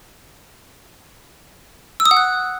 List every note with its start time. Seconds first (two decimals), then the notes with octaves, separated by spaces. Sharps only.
2.00 E6
2.05 D#6
2.11 F#5
2.17 F#6